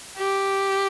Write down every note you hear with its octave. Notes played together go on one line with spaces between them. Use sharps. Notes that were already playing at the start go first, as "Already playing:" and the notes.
G4